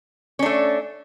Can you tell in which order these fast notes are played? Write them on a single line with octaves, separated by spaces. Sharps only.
C#4 D4 A3